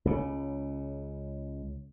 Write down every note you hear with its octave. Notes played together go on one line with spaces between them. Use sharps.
C#2 C#3